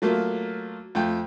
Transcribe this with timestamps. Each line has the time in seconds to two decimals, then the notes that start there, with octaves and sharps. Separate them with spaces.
0.02 F#3 A3 A#3 F4
0.95 F2 A3 G5